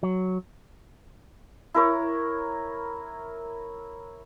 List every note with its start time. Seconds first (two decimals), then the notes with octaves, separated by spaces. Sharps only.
0.03 F#3
1.74 E4 A#4 C#5